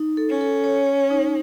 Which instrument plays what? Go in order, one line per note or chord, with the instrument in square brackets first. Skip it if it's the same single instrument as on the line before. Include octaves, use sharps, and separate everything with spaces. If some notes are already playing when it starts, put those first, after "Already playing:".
Already playing: [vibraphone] D#4
A4
[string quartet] C#4
[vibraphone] A4
C#5
C#5
D#4